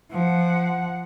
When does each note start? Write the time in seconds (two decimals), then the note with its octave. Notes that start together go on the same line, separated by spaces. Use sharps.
0.11 F3 F#5